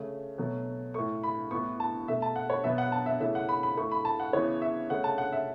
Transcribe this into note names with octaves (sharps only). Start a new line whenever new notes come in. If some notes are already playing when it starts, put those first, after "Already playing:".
Already playing: C#3 A3
B2 F#3 A3
A2 A3 C#6
B5
A2 E3 B3 C#6
A5
B2 A3 E5
A5
F#5
C#5
B2 F#3 B3 E5
F#5
A5
E5
C#3 E3 A3 E5
F#5
B5
B5
A2 A3 C#6
B5
A5
F#5
C#3 E3 B3 C#5
E5
C#3 A3 F#5
A5
F#5
E5